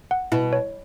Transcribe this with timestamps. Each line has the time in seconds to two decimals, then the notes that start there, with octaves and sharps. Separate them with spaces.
0.11 F#5
0.32 B2 E4
0.53 C#5